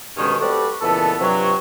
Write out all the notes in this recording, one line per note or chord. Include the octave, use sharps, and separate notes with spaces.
D2 G2 B2 D#3 G#3 C#4
G3 A3 C4 F#4 B4 D5
C#2 A#2 E3 B3 A4
G2 C3 F3 F#3